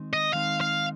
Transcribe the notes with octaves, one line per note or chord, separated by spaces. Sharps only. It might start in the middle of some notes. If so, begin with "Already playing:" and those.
Already playing: D#3 G#3 C4 D#4
D#5
D#3 G#3 C4 D#4 F5
F5